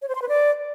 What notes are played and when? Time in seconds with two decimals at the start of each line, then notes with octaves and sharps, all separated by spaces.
0.02 C#5
0.09 C5
0.15 C6
0.22 B4
0.28 D5